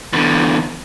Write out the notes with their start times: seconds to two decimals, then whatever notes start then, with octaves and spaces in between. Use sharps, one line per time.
0.13 E2 D3